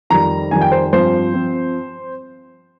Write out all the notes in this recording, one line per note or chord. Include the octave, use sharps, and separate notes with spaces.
F2 D#3 G3 A#5
F2 D#3 G3 G#5
G5
C5
G2 F3 C4 C5
F3 C4